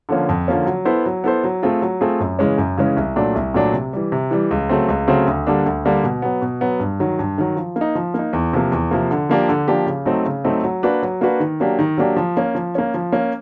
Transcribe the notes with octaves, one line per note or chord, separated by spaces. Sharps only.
D3 F3 A#3 C#4
F2
D3 F3 A#3 C#4
F#3
B3 E4 A4 C5
F#3
B3 E4 A4 C5
F#3
A3 C4 F4 G#4
F#3
A3 C4 F4 G#4
F#2
C#3 E3 G#3 C#4
F#2
C#3 E3 G#3 C#4
C2
A#2 F#3 A3 D4
C2
A#2 F#3 A3 D4
C3
E3 G3
C3
E3 G3
C#2
C#3 F#3 A3 C4
C#2
C#3 F#3 A3 C4
D2
D3 G3 A#3 D4
D2
D3 G3 A#3 D4
B2
F#3 B3
B2
F#3 B3
G2
D#3 F#3
G2
D#3 F#3
F3
A#3
D#4
F3
A#3 D#4
E2
C3 F3 A#3
E2
C3 F3 A#3
D3
F3 A#3 D4 G4
D3
F3 A#3 D4 G4
C#3
F#3 A3 C4 D#4
C#3
F#3 A3 C4 D#4
F#3
A#3 D4 F#4 B4
F#3
A#3 D4 F#4 B4
D#3
F#3 A#3 D4 G4
D#3
F#3 A#3 D4 G4
F3
A#3 C#4
F3
A#3 C#4
F3
A#3 C#4